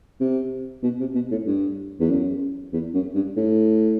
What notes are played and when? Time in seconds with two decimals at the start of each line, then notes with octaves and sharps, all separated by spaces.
0.20 C3
0.83 B2
1.00 C3
1.15 B2
1.31 A2
1.47 G2
2.00 E2
2.10 F#2
2.73 E2
2.94 F#2
3.15 G2
3.36 A2